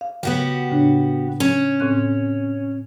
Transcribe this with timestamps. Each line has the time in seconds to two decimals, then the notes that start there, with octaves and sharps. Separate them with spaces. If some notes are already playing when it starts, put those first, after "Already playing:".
0.01 F5
0.23 C#3 B3 F#4 G4
0.70 A2 C#3 D4
1.40 C#4
1.80 A2 C4 F#6